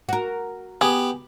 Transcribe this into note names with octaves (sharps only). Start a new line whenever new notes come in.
F#4 A#4
B3 G4 G#4